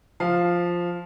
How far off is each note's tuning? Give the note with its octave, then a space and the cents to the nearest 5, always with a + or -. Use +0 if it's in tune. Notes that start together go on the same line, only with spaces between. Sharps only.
F3 +0 F5 +0